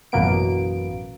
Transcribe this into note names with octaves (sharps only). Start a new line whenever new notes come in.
A1 F#2 B2 A#3 B3 D7